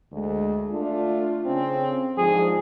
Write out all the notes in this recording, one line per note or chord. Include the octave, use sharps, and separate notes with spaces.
D2 G#3
A3 D4 F4
C#3 C4 C#4
G#2 D3 F3 G#4